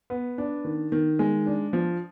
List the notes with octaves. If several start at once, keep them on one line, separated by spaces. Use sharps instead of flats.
B3
D4
D#3
D#3
G#3
D4
F3